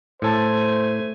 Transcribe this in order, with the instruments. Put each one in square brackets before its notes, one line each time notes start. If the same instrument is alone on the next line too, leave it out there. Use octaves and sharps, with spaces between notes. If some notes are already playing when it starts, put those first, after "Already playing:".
[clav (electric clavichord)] A2 A4 A5 [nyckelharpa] A3 G#5 [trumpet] C5